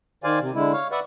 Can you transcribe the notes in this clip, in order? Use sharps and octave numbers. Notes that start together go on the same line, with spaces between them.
D#3 C5 D5 F5 G#5
C3
D3 G#3 E4
C#5 F5
B4 D5 E5 F#5